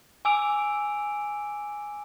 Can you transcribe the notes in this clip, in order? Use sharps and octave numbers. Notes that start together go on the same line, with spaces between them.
G#5 D6 E6 D7 F7